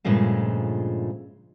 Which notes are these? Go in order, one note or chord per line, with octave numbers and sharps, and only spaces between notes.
G2 A#2 C#3 F3 G#3 A3